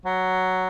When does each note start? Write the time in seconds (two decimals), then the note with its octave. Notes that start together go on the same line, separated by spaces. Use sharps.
0.05 F#3